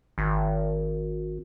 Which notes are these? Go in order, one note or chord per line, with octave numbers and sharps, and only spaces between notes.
G#1